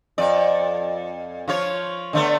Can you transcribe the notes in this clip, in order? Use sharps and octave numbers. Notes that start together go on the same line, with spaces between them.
F2 D5
F3 F4 C#5
D3 A3 B3